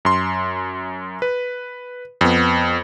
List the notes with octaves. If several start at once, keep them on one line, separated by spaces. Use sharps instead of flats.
F#2 C6
B4
F2 B3